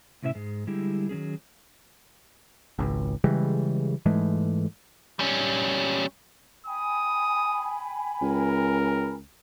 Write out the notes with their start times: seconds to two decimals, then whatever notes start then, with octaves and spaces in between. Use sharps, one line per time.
0.23 A2 C3 C#4 E4 C#5 E5
0.35 G#2 G#3
0.67 D3 G3 G#3 E4 G4
1.09 D#3 F#3 C#4 G#4
2.79 G#1 C#2
3.24 C#3 E3 G3 G#3
4.05 G#2 E3 G#3 A3
5.19 G3 C#4
6.67 G5 G#5 B5 D#6
8.22 C#2 A#4